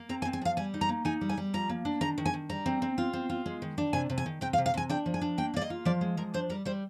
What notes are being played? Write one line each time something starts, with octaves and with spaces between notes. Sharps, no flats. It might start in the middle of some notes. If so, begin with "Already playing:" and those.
Already playing: A#3
C4 A#5
G#5
C4
G#5
F3 F5
G3 G#5
D#4
A#5
A#3
D#4 G#5
G3
G#5
G3
F3 A#5
A#3
D4
D#3 A#5
D#3
G#5
D#3
G3 A#5
C4
C4
F4
C4
F4
G#3
D#3
D4
C3 G#5
C3
G#5
D#3
C3 G5
F5
C3
F5
C3 G#5
D4 G5
F3
G#5
D4
A#3 G5
A#3 D5
D#5
F4
F3 D5
G#3
F3 A#4
D4 C5
G3 A#4
G3 C5